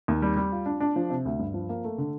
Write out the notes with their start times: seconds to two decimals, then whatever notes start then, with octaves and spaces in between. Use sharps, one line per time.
0.08 D#2
0.22 G3
0.36 G3
0.52 F4
0.66 D4
0.80 D4
0.96 F3
1.10 C3
1.25 D2
1.39 G2
1.54 F3
1.69 A#3
1.84 A3
1.98 D3